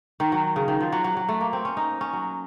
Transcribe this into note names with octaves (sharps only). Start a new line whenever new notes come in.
D#3
F#3
C#3
D#3
F3
F#3
F#3
F#3
A3
A#3
C4
C#4
D#4
C#4
F#3